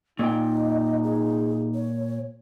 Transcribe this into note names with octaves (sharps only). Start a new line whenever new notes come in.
A#2 D#4 D#5 G5
G#4
C#5